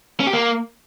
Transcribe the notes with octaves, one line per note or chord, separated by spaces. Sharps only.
C#4
G4
A#3